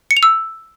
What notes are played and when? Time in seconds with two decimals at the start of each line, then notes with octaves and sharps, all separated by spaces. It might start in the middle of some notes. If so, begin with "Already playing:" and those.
0.11 C#7
0.17 F7
0.23 E6